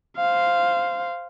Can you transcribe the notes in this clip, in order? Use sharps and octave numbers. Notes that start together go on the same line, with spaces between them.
C5 F5